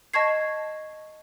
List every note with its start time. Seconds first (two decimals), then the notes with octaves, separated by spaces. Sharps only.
0.13 D#5 A5 C#6 G#6 C7